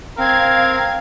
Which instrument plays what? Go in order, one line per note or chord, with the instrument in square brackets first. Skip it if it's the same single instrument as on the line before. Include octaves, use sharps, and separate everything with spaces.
[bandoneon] C4 [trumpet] A#4 [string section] F5 G#6